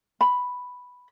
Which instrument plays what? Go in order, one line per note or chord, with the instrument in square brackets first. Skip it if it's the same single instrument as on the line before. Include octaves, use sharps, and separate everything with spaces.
[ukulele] B5